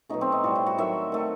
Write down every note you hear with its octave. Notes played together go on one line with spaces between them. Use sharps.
B2 F#3 A3 D#4
C4
D#4
A2 G3 F#4
E4
F#4
D#3 F#3 A3 E5
D#3 A3